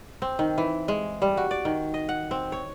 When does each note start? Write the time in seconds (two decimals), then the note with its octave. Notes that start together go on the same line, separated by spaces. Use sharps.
0.22 C4
0.39 D#3
0.58 E3
0.88 G#3
1.22 G3
1.37 F#4
1.51 D5
1.65 D#3
1.94 D#5
2.09 F#5
2.31 C4
2.52 C#5